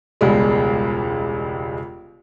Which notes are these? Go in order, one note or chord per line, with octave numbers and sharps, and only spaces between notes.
E1 C#2 G3 G#3